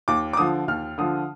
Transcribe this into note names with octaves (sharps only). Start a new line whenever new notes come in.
D#2 D6
D6
D3 F3 D#6
D#2 F6
D3 F3 D#6